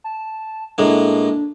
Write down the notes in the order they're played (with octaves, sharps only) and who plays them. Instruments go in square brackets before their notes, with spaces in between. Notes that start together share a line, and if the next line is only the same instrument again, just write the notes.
[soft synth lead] A5
[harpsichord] A2 G#3 A#3 [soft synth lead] D4